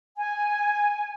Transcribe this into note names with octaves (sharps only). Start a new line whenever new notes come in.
G#5